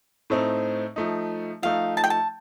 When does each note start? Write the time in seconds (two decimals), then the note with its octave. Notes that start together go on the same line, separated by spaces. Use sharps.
0.30 A2 A3 C4 D#4
0.96 F3 A3 D#4
1.62 F3 A3 D#4 F5
1.97 A5
2.04 G5
2.10 A5